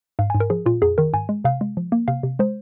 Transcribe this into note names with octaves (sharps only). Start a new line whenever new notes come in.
G#2 F5
G#5
G#2
A#4
F3 G#4
A#2 F4
F2 G#4
D#3 A#4
G#2 G#5
G#3
C3 F5
G#3
F3
A#3
C3 F5
C3
G#3 C5